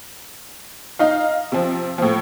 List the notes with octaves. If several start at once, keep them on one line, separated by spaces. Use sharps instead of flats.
D#4 F5
C3 F3
A2 F3